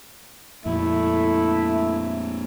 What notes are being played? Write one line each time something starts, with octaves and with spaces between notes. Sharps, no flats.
F2 A#2 A3 E4